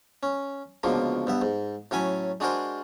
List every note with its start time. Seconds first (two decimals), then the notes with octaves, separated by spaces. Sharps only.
0.23 C#4
0.83 C#2 B2 D3 F3 A#3
1.27 G2 B3 E5
1.42 G#2
1.91 A2 F#3 C#4 C#5 G#5 B5
2.40 G#3 D4 F#4 G#4 A#4 C5